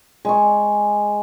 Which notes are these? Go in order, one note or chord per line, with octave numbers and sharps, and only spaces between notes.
G#3 C#6